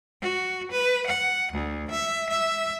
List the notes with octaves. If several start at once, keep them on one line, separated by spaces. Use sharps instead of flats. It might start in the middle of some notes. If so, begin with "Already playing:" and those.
F#4
B4
F#5
D2
E5
E5